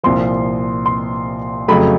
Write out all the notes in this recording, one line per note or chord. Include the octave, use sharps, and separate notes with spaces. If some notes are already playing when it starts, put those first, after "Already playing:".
C2 A#2 F3 C6
C6
F2 C#3 F#3 A3 B5